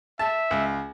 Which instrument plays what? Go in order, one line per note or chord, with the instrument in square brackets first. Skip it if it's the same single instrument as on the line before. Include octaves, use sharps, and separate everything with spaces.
[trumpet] E5 [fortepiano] A5
[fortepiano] C#2